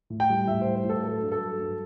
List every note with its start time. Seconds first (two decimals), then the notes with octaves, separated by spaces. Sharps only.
0.10 A2
0.20 G5
0.30 G3
0.48 A2 E5
0.61 C5
0.66 G3
0.75 C5
0.85 A2 A4
1.03 F#3 A4
1.22 G2
1.32 A4
1.41 F#3
1.59 G2